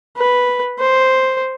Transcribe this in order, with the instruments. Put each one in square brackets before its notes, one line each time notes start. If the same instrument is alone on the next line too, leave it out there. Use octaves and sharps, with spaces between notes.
[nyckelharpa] B4
C5